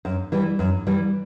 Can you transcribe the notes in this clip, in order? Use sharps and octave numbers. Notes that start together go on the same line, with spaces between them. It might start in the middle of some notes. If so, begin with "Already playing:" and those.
F#2
E3 G3
F#2
E3 G3